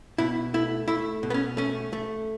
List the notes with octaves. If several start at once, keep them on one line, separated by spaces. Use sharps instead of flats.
B2 E4
A3 E4
A3 E4
B2
B3
C#4
A3 C#4
A3